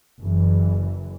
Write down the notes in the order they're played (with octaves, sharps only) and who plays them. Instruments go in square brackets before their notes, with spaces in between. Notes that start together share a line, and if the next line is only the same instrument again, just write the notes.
[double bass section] F#1 E3